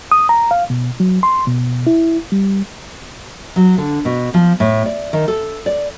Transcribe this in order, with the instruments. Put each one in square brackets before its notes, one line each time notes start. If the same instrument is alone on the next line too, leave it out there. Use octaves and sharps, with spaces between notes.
[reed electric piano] D#6
A#5
F5
B2
F#3
C6
B2
E4
G3
[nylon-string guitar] F#3
D3
B2
F3
A2
D5
D#3
A4
D5